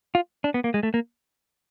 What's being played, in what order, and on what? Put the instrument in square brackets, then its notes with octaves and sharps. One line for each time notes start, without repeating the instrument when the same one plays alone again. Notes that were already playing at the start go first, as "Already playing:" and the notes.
[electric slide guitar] F4
D4
B3
A#3
G#3
A3
A#3